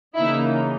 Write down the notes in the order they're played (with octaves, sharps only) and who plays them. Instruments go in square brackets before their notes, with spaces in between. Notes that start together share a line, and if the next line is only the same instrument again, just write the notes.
[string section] C#3 E3 A#3 D#4 E4